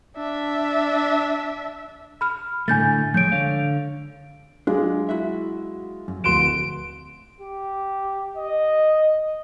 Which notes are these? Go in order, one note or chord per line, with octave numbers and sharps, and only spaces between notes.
D4 E5
B5 F6
A2 D3 A3 G#5 G6 A6
F3 G#3 C#5 G6 D7
D3 C#5 F5
F#3 G#3 D4 F4
E4 F#4 E5
F#2
D1 F3 C6 F#6 D7 E7
G4
D#5